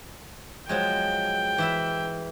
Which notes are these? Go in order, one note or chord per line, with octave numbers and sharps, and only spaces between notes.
F3 F#3 G#3 G5
E3 E4 E5